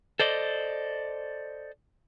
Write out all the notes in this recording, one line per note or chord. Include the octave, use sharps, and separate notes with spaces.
A4 C5 D5 D#5